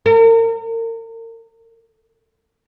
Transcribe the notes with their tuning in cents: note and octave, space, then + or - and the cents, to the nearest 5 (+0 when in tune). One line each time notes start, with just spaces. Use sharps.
A#4 -40